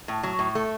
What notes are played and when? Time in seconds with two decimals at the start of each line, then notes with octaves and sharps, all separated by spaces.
0.08 A2
0.23 F#3
0.39 A2
0.55 A3